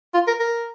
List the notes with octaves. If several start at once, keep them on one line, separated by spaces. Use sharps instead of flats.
F4
A#4
A#4